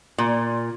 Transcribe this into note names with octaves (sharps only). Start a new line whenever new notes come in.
A#2